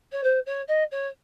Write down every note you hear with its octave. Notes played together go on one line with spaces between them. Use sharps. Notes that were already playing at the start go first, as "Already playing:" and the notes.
C#5
C5
C#5
D#5
C#5